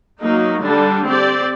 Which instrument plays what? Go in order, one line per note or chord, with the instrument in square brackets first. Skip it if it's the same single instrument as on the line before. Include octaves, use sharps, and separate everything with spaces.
[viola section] F#3 A#3 D#4
D3 G3 D4 A4
C4 G4 D5